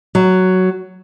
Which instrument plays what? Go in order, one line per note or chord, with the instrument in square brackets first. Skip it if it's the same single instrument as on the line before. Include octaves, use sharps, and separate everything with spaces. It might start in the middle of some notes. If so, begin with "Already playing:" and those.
[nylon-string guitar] F#3